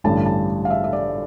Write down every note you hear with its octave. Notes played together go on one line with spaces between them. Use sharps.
A1 G2 D3 G3 A5
A5
F5
E5
E5
D5